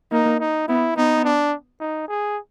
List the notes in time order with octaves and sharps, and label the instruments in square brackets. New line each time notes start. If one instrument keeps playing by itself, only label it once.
[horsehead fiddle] A#3 [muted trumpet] D#4
[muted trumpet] D#4
[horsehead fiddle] B3 [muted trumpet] E4
[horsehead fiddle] B3 [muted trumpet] D#4
[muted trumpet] D4
D#4
G#4